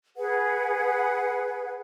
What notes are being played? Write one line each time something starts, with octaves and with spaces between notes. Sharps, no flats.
G#4 B4 F#5